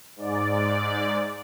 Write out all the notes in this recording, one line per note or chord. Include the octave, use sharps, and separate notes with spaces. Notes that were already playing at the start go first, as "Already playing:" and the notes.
G#2 D5